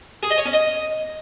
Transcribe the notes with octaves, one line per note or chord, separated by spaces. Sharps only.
G#4
D#5
C#5
C#4
D#5